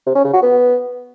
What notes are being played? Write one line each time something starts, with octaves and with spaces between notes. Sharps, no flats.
C3
C#4
C#3
F#4
B3